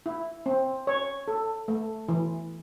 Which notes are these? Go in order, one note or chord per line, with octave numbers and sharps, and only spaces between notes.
E4
C4
C#5
A4
A3
E3